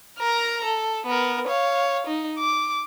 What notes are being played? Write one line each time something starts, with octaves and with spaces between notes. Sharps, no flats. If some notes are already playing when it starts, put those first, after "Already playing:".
A#4 A#5
A4
B3 A#4
C#5 F5
D#4
D6